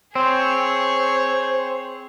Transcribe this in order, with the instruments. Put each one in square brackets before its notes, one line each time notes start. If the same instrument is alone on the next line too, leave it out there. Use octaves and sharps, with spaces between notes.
[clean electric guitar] C4 [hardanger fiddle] G#4 C#5 [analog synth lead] C5